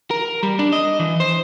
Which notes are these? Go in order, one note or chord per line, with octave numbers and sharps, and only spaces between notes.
A#4
G3
D4
D#5
E3
C5